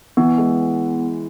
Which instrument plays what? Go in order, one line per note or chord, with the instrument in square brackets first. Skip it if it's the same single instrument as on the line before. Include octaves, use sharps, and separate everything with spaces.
[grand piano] E3 [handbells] B3
[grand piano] G#3